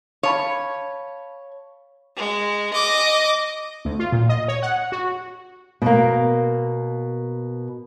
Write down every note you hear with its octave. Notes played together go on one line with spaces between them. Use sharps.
C#5 F5 A5 B5
G#3
D#5 D6
D2
F4
A#2
D#5
C#5
F#5
F#4
B2 A#3